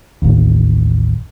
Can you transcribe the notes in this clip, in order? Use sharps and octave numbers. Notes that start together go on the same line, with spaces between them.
A1 D#2